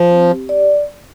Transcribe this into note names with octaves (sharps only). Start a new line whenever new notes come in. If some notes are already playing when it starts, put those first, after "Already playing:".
Already playing: F3
C4
G4
D5